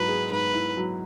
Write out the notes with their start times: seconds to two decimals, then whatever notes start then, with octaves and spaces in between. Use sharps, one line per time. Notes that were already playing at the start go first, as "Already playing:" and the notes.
Already playing: G#2 F#3 E4 B4
0.08 G#4
0.32 G#2 B4
0.54 E4
0.77 F#3